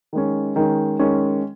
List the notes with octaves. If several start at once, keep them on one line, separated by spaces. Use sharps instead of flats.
D#3 G#3 C#4
D#3 G#3 C#4
D#3 G#3 C#4